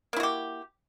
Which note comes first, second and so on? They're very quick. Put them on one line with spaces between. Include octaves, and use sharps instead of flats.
A#3 E4 F#4 G4